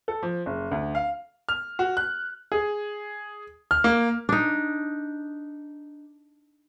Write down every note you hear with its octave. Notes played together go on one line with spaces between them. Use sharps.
A4
F3
F#1
D2
F5
F6
F#4
F#6
G#4
F6
A#3
D4 D#4